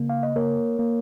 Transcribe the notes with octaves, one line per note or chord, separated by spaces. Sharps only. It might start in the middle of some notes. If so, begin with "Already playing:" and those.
Already playing: C#3 A#3
F5
D#5
A#3 A#4 C#5
A#3